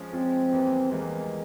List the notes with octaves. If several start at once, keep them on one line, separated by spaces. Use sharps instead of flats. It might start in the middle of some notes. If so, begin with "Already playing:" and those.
Already playing: F3 G#3 C#4
F3 G#3 C4 C#4
E2 E3 G3 A#3
E2 E3 G3 G#3 A#3